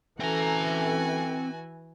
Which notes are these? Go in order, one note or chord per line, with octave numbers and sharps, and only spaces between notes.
E3 A3 C4 C#4 F#4 A4 G#5 A#5